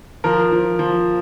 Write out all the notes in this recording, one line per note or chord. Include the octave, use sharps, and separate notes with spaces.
F3 A#4
F3
F3